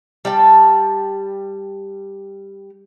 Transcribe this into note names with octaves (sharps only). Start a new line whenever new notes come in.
G3 G5 A5